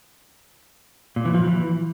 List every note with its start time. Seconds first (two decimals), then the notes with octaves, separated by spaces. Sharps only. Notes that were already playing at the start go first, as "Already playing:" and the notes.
1.16 A#2
1.25 E3
1.34 F3
1.43 E3